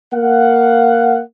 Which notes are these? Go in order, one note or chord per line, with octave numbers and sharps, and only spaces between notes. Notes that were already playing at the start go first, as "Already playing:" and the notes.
A#3 F5 F#5